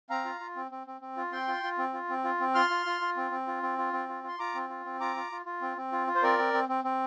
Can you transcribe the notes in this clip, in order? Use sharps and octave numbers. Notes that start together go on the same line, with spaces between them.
C4 F5 A#5
F4
F4
C4
C4
C4
C4
F4
C4 G5 C6
F4
F4
C4
F4
C4
F4
C4
F4 C6 F6
F4
F4
F4
C4
C4
F4
C4
F4
C4
F4
F4
C6
F4 A#5 D6
C4
F4
C4
F4 A#5 D6
F4
F4
F4
C4
C4
F4
F4
C5
C4 A#4 D5
C4
C4
C4
C4